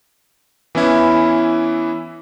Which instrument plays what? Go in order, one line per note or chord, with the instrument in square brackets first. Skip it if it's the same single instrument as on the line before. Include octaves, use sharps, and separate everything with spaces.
[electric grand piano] E3 B3 C#4 E4